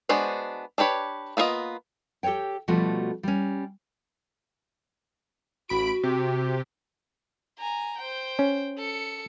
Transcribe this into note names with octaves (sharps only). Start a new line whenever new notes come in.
G#3 B3 D4 F#4 C5
D4 G4 B4 C#5
A#3 B3 D4 F4 D#5
G4 A4 C5 C#5 G5
B2 F3 G3 A3 F#4 A4
G3 C#4
A1 F#4 B5 D7
C3 G4
G#5 A#5
C5 G5
C#4
A4 C#7